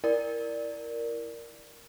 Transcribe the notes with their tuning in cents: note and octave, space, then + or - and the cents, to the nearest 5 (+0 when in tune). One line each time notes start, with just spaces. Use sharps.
E4 +0 A#4 +0 D5 +0